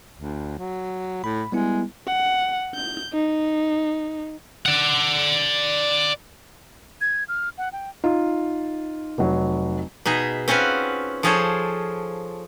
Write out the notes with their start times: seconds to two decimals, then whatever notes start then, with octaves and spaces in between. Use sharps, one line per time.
0.18 D2
0.59 F#3
1.24 A2 B5
1.52 G3 G#3 B3 E4
2.07 F#5
2.75 G6
3.13 D#4
4.66 D5 F#5
7.01 G#6
7.29 F6
7.58 F#5
7.73 G5
8.04 D#4 F4
9.18 F1 F#3
10.06 B2 D#4 G#4 E5
10.48 C4 C#4 F4 F#4 B4
11.23 F3 F4 G#4 A4 C5 C#5